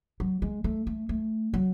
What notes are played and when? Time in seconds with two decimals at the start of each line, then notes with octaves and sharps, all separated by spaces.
0.20 F#3
0.42 G#3
0.64 A3
0.87 A3
1.09 A3
1.54 F#3